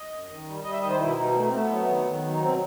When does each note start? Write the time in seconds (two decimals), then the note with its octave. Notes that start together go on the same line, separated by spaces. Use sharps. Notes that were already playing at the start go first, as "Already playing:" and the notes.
Already playing: D#5
0.10 F#2
0.29 D#3
0.46 G3
0.64 G3 D#5
0.72 E5
0.81 D#3 D#5
0.90 C5
0.99 B2 E4
1.17 B2 D#4
1.34 A3 D#4
1.47 C4
1.53 A3
1.58 B3
1.70 F#3
1.87 D#3
2.05 D#3
2.23 F#3
2.31 D#4
2.41 B2 C4